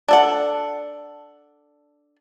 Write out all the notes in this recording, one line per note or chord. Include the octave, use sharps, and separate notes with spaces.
D4 A4 F#5